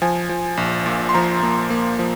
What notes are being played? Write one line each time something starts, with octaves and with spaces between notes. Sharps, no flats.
F3 G#5
F3
A#1
A#2
C6
F3 A#5
A#3
A#3
F3